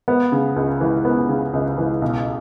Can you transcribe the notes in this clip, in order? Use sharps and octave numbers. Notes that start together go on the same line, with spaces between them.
B3
C#3
C#2
E3
B3
C#3
C#2
E3
B1